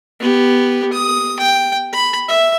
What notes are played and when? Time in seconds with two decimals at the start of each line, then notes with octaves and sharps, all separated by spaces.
0.20 B3 G4
0.93 D#6
1.40 G5
1.93 B5
2.28 E5